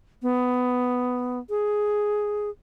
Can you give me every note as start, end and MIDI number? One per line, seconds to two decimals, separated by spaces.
0.22 1.39 59
1.50 2.50 68